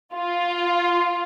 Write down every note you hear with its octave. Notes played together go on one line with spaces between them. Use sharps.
F4